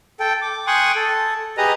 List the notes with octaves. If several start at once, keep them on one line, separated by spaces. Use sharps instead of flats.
A4 G5
D6
G5 G#5 C6 C#6 D#6 F#6
A4
G4 G#4 B4 D#5 A#5 D#6